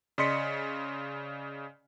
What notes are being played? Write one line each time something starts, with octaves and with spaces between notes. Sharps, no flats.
C#3 D5 D#5 C6 B6 C#7